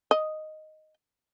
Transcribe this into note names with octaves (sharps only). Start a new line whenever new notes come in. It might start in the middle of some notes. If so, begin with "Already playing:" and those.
D#5